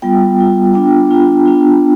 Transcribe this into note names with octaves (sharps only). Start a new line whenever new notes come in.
G3 B3 F4 G5
G3 B3 F4
B3 D4 F4 G5
B3 D4 F4
B3 D4 F4